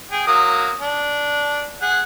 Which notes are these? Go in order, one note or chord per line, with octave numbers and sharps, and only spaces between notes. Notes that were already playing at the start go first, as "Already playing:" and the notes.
G#4 G5
F#3 A#3 D#6
D4
G#4 F#5